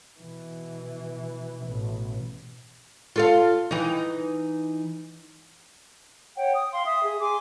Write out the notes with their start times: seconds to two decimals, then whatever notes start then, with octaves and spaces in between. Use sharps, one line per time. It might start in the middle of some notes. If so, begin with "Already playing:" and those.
0.19 B2 E3
1.62 A1 B2
3.16 F4 A4 F5
3.71 E3 D#4
6.37 C#5 F#5 G5
6.56 D#6
6.72 F5 G5 C6
6.86 E5 D#6
7.04 G#4
7.20 G#4 G#5 C6 D6